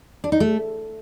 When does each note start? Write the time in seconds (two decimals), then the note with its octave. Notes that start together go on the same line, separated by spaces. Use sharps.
0.24 D4
0.32 D#4
0.40 A3